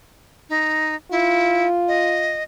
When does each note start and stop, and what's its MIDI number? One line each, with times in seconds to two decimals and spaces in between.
0.49 0.95 63
1.11 1.67 64
1.11 2.43 65
1.88 2.43 75